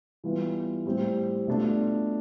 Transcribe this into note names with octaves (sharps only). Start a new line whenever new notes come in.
E3 G3 B3 F4
A2 G3 C4 G4
B2 A3 D4 F4